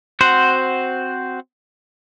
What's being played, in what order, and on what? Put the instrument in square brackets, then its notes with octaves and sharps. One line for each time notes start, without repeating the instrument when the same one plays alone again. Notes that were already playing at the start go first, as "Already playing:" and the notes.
[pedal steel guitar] C4 F#4 C5 F#5